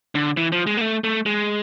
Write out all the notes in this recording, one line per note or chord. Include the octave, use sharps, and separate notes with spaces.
D3
E3
F3
G#3
A#3
A3
A3
G#3